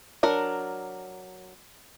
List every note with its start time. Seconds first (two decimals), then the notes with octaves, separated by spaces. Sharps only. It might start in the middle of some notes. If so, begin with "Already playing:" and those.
0.23 F#3 D4 A#4